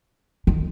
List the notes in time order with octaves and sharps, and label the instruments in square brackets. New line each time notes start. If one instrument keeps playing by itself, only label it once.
[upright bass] D#3